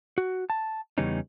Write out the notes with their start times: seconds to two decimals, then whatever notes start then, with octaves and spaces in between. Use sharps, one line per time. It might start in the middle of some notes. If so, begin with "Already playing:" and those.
0.18 F#4
0.50 A5
0.98 E2 C#3 G3 B3 C#4 D#4